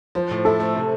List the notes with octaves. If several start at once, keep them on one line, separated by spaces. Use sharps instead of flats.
F3 C5
A2
E4 A4
A3
C3